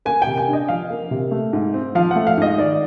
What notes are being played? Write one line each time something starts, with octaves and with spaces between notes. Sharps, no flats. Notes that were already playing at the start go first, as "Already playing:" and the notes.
A#3 G#5
G5
C3
G#5
D4
D#5
F3 F5
A#3
C3
A3
G#2
C4
F3 F5
A3 F#5
F5
G#2 D#5
D#3 D5